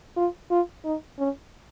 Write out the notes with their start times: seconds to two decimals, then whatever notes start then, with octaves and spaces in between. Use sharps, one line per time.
0.17 F4
0.51 F4
0.85 D#4
1.19 C#4